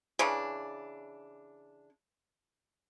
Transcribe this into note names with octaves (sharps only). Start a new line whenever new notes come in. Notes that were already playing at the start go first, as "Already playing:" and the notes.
C#3 E3 D4